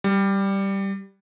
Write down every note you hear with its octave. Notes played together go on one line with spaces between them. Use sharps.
G3